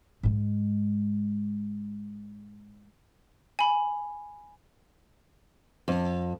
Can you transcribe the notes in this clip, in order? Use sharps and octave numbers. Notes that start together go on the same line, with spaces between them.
G#2 G#3
G#5 B5
F2